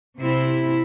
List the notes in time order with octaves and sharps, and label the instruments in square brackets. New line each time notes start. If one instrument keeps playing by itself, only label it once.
[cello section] C3 C4 E4